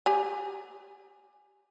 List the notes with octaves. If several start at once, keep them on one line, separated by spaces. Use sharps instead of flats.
G4 G#5